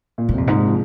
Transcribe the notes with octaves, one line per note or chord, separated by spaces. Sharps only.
A#2
G#2
F2 C3
G#2
G#3
F3